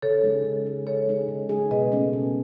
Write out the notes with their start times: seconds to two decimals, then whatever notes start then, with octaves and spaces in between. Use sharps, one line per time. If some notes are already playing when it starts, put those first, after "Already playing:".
0.02 C#3 A4 C#5
0.23 G#3 D#4 G#4
0.44 C#3
0.66 G#3 D#4 G#4
0.86 C#3 A4 C#5
1.08 G#3 D#4 G#4
1.29 C#3
1.49 G#3 D#4 G#4
1.71 B2 B4 D#5
1.92 A3 C#4
2.13 B2